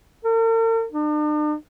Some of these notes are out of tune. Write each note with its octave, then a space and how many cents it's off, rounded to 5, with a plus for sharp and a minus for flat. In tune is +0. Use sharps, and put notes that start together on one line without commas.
A#4 -45
D4 +45